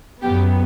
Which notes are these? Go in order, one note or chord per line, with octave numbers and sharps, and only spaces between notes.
F#2 F#3 B3 G4